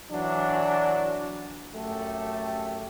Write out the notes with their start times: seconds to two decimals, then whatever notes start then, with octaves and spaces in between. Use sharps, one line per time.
0.12 E3 F#3 D4
1.73 F#2 A3 G4 A4